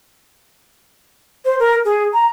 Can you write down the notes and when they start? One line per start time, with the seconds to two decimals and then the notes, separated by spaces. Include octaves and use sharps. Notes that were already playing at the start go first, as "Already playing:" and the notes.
1.45 C5
1.59 A#4
1.85 G#4
2.14 A#5